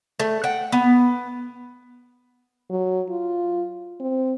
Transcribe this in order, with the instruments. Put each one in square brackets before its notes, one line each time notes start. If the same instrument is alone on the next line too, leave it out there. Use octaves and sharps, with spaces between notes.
[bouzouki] A3
F#5 G5
B3
[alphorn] F#3
F4
C4